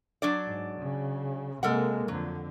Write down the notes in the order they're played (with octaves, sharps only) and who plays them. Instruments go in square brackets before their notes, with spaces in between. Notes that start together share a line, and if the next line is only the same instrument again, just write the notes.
[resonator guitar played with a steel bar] F#3 D4 D5
[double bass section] G#2
C#3
[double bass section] C3 G#3 A#3 [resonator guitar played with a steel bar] A4 A#4 F#5
[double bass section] F2 D3 [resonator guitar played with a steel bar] F#3